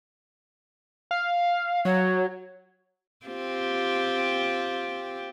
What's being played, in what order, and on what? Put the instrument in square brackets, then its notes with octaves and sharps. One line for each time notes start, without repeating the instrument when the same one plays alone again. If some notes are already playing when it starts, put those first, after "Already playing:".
[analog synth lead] F5
[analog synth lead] F#3 [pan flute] C#5
[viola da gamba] C4 F4 G4